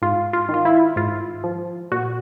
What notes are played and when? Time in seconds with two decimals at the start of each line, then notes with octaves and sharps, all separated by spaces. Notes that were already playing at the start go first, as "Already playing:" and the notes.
0.02 G#2 F4
0.33 F4
0.49 D#3
0.54 F4
0.65 E4
0.96 G#2 F4
1.44 F3
1.91 A#2 F#4